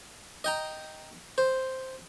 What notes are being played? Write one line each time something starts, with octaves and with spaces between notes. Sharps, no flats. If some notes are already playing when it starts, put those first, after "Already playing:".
D#5 G5 A#5
C5